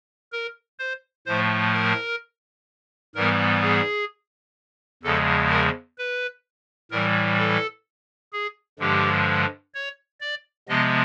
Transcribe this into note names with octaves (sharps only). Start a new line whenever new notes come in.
A#4
C5
A2 F3 A3 C5
A#4
G#2 E3 G3 B3 A#4
G#4
E2 C#3 F3 G#3 A4
A#4
B4
A2 E3 G3 A#4
A4
G#4
G2 D3 F3 G#3 G4
C#5
D5
C3 F3 G#3 B3 D#5